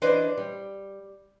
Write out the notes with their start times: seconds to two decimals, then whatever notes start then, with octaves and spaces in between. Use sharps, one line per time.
0.02 E3 D4 B4 C5 D5 D#5
0.37 G3